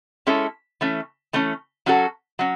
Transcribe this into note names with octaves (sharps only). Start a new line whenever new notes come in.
G#3 C#4 E4 A4
E3 A3 C#4
E3 A3 C#4
F#3 C#4 F#4 A4
F#3 C#4